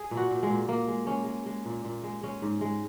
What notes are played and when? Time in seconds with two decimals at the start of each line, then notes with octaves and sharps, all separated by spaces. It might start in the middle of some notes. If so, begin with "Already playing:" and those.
Already playing: G#4
0.11 A#2
0.17 F#4
0.31 A#2
0.43 G#3
0.50 A#2
0.69 A#2 A#3
0.88 G#3
1.07 G#3 C#4
1.26 G#3
1.46 G#3
1.65 A#2
1.85 A#2
2.04 G#3
2.23 G#3 C#4
2.42 G#2
2.61 G#3